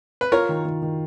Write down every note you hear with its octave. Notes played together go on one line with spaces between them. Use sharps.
B4
F4 A#4 C#5
D#3
D#3
D#3